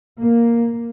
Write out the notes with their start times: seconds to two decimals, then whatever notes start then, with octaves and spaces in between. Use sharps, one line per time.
0.19 A#3